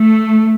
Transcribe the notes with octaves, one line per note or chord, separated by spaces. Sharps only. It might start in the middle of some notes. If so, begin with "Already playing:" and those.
Already playing: A3